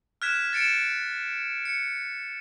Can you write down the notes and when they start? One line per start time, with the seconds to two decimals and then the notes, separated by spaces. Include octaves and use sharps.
0.22 F6 F#6 G#6 B6 E7
0.53 A6 C#7 D7 E7
1.65 C#7